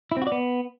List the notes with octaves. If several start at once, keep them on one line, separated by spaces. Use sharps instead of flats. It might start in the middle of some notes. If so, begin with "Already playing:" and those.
E4
C4
F#4
D5
B3